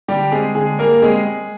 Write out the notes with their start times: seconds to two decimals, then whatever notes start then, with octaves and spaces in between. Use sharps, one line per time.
0.08 D3 G3 G4
0.32 G#3 C4 G#4
0.55 D3 G#3 G#4
0.79 G3 A#3 A#4
1.02 G#3 C4 G#4
1.26 G#3